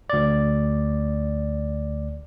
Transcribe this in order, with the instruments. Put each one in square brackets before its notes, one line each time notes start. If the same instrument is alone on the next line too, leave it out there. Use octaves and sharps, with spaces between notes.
[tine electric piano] D2 D5